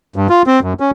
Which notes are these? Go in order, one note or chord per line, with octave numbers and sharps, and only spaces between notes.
G2
F4
C4
F#2
C#4